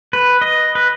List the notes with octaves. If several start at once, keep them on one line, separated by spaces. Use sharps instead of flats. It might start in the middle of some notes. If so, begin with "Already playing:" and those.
B4
D#5
B4